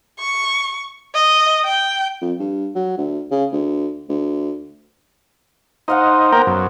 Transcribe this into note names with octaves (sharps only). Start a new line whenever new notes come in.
C#6
D#5
G5
F2
G2
F#3
D2
C#3
D2
D2
D#4 C5 F5 F#5
A#3 B3 A#4 G5
F#2